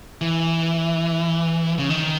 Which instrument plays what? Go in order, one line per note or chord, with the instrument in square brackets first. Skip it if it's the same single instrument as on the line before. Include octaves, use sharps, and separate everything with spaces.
[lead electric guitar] E3
C#3
D#3